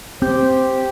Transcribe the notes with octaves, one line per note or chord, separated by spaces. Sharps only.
C4 G4 C5